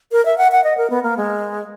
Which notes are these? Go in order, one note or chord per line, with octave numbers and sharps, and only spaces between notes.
A#4
E5
F#5
F#5
D#5
A#4
B3
A#3
G#3